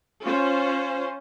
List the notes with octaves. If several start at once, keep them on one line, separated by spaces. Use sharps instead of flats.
C#4 F4 C5